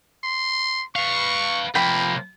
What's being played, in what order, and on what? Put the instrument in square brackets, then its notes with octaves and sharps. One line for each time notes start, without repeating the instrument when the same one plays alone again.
[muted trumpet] C6
[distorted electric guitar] B4 F5 [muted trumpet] C#6
[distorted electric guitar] C3 F3 [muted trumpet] A#3 [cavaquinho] G5 B5